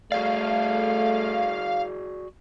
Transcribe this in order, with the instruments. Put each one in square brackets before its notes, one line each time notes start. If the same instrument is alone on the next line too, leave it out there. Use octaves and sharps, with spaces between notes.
[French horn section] A3 [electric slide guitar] F#4 G#4 D5 [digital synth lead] F5